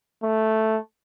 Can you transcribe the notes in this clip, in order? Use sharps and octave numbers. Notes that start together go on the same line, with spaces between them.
A3